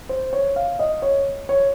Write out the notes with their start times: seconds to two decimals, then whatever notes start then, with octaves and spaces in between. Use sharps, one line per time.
0.09 C5
0.33 C#5
0.56 F5
0.79 D#5
1.02 C#5
1.49 C#5